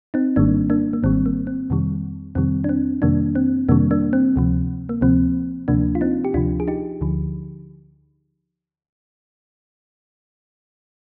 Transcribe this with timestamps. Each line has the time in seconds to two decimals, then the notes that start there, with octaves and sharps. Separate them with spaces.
0.14 C4 D#4
0.36 G#1 G#2 D#3 G3 A#3 D4
0.70 A#3 D4
0.93 A#3
1.03 G#1 G#2 D#3 G3 C4
1.26 A#3
1.47 C4
1.70 F2 C3 D#3 G3
2.35 F2 C3 D#3 G3 C4
2.64 D4
2.69 C4
3.02 F2 C3 D#3 G3 A#3 D4
3.35 C4
3.69 F2 C3 D#3 G3 A#3 D4
3.91 A#3 D4
4.13 C4
4.36 D2 C3 F3
4.89 A#3
5.01 D2 C3 F3 C4
5.68 D2 C3 F3 A#3 D4
5.95 F4
6.01 C4 D#4
6.25 G4
6.34 D2 C3 F3 D4 F4
6.60 G#4
6.68 D#4 G4
7.01 D2 D3 F3